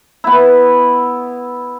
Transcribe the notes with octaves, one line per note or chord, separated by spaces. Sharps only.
B3 E4